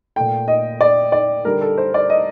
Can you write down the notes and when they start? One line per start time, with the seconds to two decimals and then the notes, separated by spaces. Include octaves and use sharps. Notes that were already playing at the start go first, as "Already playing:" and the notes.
0.16 A#2 A3 G5
0.48 D#5
0.81 D5
1.12 D5
1.45 D3 G3 A#4
1.61 A4
1.78 C5
1.94 D5
2.10 D#5